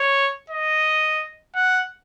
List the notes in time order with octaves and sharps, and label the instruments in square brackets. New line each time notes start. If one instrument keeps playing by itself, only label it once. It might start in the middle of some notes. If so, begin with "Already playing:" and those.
Already playing: [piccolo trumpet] C#5
D#5
F#5